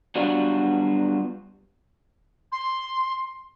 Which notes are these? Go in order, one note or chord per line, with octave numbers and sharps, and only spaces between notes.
F#3 G3 B3 D4 F4 F#4
C6